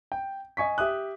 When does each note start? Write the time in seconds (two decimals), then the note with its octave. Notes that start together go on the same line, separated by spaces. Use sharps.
0.12 G5
0.57 D#5 G#5 C#6 B6
0.78 G4 E5 D#6 F#6